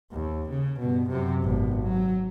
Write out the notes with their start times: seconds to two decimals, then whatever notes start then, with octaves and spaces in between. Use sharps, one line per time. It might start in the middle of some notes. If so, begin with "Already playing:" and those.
0.12 D#2
0.50 C#3
0.80 G2 B2
1.08 F#2 C3
1.42 G#1 B2
1.84 F#3